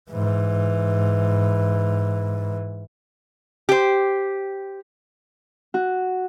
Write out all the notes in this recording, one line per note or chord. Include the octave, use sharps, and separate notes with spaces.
G#2 E3
G4 C5
F#4